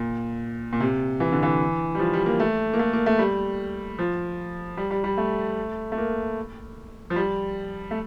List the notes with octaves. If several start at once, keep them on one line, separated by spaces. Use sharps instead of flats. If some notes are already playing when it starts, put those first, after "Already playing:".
Already playing: A#2
A#2
C3
E3
D3
E3
G3
F3
G3
A#3
A3
A#3
A3
A#3
A3
G3
F3
G3
G3
G3
A3
A3
A#3
F3
G3
A3